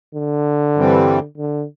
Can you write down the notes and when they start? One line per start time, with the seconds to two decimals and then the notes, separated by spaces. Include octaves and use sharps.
0.15 D3
0.76 G2 E3 G3 C4
1.37 D3